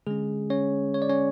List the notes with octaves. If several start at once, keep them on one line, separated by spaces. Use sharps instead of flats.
D3 G#3 C#4 G#4
C#4 C#5
C#5
D5
C#4 C#5